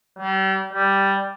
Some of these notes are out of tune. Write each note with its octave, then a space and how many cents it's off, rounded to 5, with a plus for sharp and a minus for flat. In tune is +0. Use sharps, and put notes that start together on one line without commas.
G3 -35
G3 +0